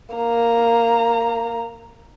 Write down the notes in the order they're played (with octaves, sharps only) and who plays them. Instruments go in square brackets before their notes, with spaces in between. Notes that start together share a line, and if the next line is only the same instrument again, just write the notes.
[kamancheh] A#3 A#5